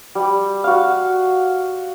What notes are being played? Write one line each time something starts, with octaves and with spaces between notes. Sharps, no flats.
G3
F#4 F5